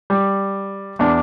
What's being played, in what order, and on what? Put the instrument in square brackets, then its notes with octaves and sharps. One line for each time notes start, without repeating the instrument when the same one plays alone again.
[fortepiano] G3
E2 D4